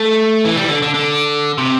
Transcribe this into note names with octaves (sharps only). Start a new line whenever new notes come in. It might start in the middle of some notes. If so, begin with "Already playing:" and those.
Already playing: A3
E3
G3
E3
D3
D3
D3
C3